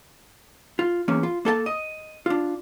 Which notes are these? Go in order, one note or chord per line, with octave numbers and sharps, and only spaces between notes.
F4
E2 A#3 C#4
F4
A#3 A4 E5 A5
D#5
D4 F4